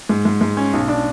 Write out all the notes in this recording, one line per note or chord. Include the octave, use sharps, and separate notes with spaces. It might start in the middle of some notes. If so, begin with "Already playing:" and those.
G#2
G#2
G#2
C#4
B1
D4